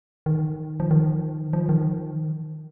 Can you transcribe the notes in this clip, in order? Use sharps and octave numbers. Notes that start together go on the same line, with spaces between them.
D#3
F3
D#3
F3
D#3